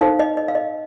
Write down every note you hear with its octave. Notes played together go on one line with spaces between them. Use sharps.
D#4 A4 C5 F5
D#5
D#5
F5
D#5